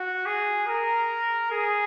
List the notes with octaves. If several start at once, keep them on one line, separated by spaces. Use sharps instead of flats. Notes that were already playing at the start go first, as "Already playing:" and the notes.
Already playing: F#4
G#4
A#4
G#4